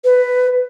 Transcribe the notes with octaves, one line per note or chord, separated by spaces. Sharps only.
B4